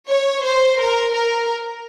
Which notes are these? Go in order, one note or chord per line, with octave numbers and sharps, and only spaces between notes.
C#5
C5
A#4
A#4